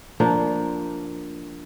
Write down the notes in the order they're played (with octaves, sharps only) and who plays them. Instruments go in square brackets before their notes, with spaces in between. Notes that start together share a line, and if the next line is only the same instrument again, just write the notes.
[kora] F3 A#3 D4